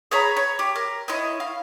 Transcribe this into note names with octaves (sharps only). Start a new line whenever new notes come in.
G#4 C#5 A#5 B5
C#5
G4
A#4
E4 C#5 D#5
F5